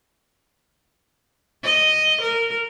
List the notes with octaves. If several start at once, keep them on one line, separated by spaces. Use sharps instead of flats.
D#5
A#4